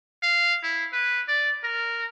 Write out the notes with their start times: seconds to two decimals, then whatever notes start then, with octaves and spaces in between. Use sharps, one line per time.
0.22 F5
0.63 E4
0.93 B4
1.28 D5
1.64 A#4